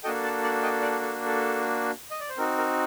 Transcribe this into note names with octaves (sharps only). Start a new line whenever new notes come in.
A#3 D4 F#4 A4 D#5 G5
F#5 A5
D5 F#5
D#5 G5
D5 F#5
A4
A4
D#5
D5
C5
C4 D#4 F#4 A#4
A#4